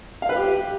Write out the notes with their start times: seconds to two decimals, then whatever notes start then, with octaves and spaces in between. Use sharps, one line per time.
0.22 F5
0.29 B4
0.36 G4